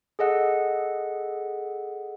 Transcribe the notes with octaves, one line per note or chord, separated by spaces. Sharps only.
G#4 A4 D#5 F#5